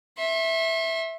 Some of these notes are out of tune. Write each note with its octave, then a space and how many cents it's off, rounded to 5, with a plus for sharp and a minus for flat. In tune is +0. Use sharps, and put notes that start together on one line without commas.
E5 -5 C6 +45